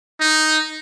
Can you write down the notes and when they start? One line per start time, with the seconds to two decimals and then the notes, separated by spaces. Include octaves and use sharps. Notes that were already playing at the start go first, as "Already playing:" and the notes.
0.20 D#4